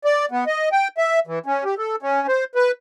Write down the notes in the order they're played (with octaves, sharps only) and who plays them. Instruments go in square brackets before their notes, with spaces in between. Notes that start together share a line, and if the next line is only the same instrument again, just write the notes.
[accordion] D5
B3
D#5
G5
E5
E3
C#4
G4
A4
C#4
C5
B4